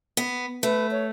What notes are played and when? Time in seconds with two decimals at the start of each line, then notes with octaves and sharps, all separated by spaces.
0.17 B3
0.63 A3 B4
0.91 C#5